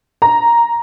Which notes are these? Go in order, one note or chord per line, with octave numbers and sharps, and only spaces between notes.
A#5